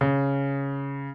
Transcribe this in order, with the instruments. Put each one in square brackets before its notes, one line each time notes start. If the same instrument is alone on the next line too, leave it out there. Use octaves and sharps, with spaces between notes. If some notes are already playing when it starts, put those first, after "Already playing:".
[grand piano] C#3